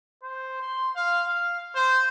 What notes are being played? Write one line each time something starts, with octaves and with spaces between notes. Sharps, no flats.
C5
C6
F5
F5
C5